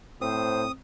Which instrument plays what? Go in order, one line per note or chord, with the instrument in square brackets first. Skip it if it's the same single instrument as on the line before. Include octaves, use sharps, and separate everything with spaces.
[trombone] A2 [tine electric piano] C4 [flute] C5 [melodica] D#6